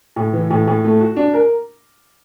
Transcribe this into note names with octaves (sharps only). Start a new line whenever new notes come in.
A2
E3
A2
A2
A3
F#4
D4
A#4